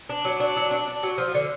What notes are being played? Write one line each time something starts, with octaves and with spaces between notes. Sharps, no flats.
D4
F#3
D4
F#3
D4
D4
F#3
F3
D3